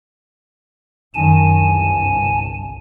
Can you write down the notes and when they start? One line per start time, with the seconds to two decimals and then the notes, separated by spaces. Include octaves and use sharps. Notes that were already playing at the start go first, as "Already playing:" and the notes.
1.14 F#2 D#3 G#5 A5
1.57 G1 C2